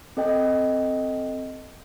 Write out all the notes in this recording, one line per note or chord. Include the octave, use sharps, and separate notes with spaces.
C4 A4 D#5 G5